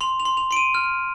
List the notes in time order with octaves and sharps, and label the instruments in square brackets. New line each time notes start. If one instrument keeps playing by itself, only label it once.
[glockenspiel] C6 F7
F7
C6
F7
C6 D7
D#7
F6